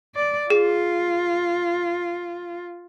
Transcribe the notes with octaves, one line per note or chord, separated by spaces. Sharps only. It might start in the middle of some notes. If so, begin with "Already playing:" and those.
D5
F4 G#4